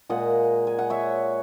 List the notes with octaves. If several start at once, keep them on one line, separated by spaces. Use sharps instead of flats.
A#2 G#3 D#5 F#5
G#5
F#5
C#5 E5